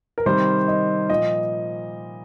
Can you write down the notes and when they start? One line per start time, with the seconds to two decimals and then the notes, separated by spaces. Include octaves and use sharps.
0.18 A#4
0.26 C3 D#3 G3 C5
0.68 D#5
1.10 A#2 F3 D#5